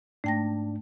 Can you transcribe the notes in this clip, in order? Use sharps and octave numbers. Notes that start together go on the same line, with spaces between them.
G#2 A3 D4 G5 A#6